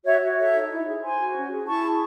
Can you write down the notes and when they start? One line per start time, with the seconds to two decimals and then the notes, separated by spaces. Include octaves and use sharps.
0.05 F#4 C#5 E5
0.22 F#4
0.38 A4 C#5 E5
0.54 D#4
0.71 E4
0.86 G#4
1.02 C5 G#5 C6
1.19 F#4
1.35 C#4
1.52 G#4
1.67 E4 A5 C#6
1.84 G#4